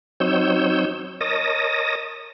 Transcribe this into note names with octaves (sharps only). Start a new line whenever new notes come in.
F#3 C4 D#4 C#5 E6 G6
A#4 C#5 D#5 A5 D#6 A#6